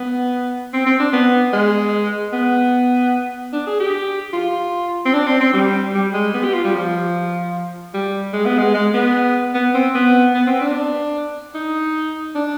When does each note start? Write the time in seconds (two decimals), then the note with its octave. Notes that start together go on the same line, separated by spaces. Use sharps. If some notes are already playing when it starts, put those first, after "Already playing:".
Already playing: B3
0.73 C4
0.86 C4
1.00 D4
1.13 B3
1.53 G#3
2.33 B3
3.53 D4
3.67 G#4
3.80 G4
4.33 F4
5.05 C4
5.13 D4
5.26 C4
5.40 C4
5.53 G3
5.94 G3
6.13 G#3
6.34 B3
6.44 G4
6.54 F4
6.64 G3
6.74 F3
7.94 G3
8.33 G#3
8.45 B3
8.58 G#3
8.74 G#3
8.94 B3
9.54 B3
9.74 C4
9.95 B3
10.34 B3
10.47 C4
10.61 D4
11.54 D#4
12.35 D4